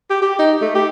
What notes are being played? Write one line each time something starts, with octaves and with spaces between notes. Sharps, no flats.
G4
G4
D#4
A3
G4